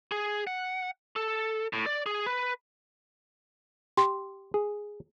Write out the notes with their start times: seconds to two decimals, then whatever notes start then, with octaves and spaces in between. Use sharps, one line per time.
0.12 G#4
0.47 F#5
1.16 A4
1.73 A2
1.86 D5
2.06 G#4
2.26 B4
3.97 G4 C6
4.54 G#4